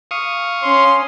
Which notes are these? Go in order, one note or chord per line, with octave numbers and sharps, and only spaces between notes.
F5 C#6 D#6
C#4 C6